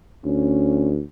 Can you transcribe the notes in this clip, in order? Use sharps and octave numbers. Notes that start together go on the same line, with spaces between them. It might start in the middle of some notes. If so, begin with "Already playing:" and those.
D2 C#4